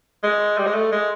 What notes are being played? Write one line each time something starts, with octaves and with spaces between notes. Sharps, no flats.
G#3
G3
G#3
A3
G#3